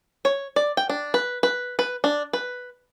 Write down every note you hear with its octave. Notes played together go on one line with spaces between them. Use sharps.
C#5
D5
G5
D4
B4
B4
B4
D4
B4